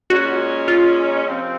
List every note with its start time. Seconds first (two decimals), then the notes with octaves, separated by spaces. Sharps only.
0.10 A#2 G#3 C#4 F#4
0.68 F4
1.25 C3 F3 C4